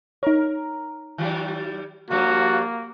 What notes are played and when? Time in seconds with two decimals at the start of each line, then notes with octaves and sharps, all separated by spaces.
0.23 D#4 A#4 C#5
1.18 D#3 F#3 G3
2.10 G2 F3 G3 A#3 F#4